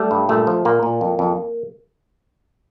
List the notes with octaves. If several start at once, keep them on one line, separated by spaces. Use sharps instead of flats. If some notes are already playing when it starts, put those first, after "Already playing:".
Already playing: G3 A3
G2
A#2 A3
F3
A#2 A#3
A#2
F2
F2